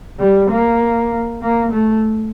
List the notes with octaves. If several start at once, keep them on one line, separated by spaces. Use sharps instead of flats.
G3
A#3
A#3
A3